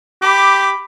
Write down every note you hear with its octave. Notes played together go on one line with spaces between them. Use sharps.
G4 B5 D6